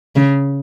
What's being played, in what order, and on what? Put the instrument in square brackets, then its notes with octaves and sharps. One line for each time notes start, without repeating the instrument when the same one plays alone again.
[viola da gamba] C#3